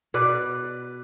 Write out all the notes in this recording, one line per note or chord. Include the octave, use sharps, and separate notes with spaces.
B2 B4 D5